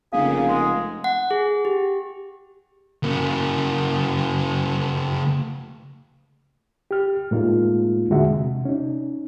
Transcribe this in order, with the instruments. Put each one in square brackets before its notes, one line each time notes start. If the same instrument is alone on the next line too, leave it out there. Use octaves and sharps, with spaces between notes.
[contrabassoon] F1 [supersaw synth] C#3 A#3 [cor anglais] G#4 [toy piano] F5
[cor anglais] G#3
[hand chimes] F#5
G#4
G4
[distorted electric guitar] C#3 A#3
[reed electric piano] G4 F6
A2 G#3 A#3 D#4 F4
E2 D3 G#3 F#4 E5 F#5
C3
C#4 D#4